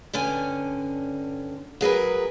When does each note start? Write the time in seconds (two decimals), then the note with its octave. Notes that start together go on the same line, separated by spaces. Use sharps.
0.13 G2 D3 C#4 G#5
1.81 F#3 G#4 A#4 B4